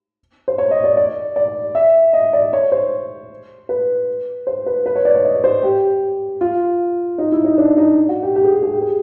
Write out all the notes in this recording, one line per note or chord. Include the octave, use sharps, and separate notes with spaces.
C5
C#5
D#5
D5
D5
D5
E5
D#5
D5
C#5
C5
B4
C5
B4
B4
C#5
D5
C#5
D#5
C5
G4
F4
D#4
E4
D#4
D4
D#4
F#4
G4
G4
G#4
G4
G#4
G4
G#4